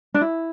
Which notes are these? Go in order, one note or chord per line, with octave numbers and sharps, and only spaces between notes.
D4
E4